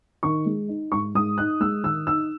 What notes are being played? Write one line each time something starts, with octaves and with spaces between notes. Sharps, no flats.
D#3 C#6
G#3
D#4
G#2 C#6
G#2 D#6
D#4 F#6
G#3 E6
D#3 E6
D#4 E6